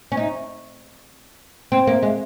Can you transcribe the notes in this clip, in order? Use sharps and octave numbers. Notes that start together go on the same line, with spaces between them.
C#4
D#4
C4
A#3
G#3